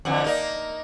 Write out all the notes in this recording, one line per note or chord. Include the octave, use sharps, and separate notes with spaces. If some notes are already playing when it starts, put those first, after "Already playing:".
F2 D3 E3
A#3 D#4